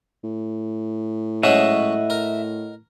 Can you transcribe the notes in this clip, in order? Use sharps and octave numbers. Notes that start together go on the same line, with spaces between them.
A2
G#2 F#3 C#4 D#5 E5 F#5
A#4